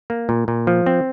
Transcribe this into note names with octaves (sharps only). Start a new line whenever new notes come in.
A#3
A#2
A#2
F3
C4